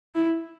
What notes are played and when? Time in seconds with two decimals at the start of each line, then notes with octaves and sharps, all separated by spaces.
0.15 E4